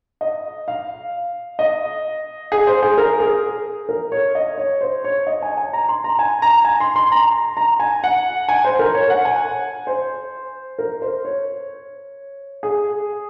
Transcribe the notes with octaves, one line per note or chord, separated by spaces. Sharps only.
D#5
F5
D#5
G#4
C5
G#4
A#4
G#4
A#4
C#5
D#5
C#5
C5
C#5
D#5
G#5
G#5
A#5
C6
A#5
G#5
A#5
G#5
C6
C6
A#5
A#5
G#5
F#5
G#5
C5
A#4
C#5
F#5
G#5
C5
A#4
C5
C#5
G#4